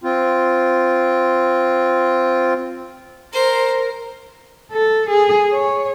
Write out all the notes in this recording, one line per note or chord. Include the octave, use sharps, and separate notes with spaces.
C4 F4
A#4 C5
A4
G#4
C#5